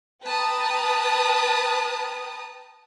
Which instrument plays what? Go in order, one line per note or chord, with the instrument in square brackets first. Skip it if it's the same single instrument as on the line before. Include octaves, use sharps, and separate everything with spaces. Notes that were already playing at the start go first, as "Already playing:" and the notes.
[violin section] B4 G5 A5 A#5 D#6